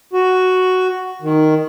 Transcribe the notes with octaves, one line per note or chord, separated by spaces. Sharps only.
F#4
D#3